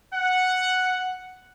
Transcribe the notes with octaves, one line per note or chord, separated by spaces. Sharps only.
F#5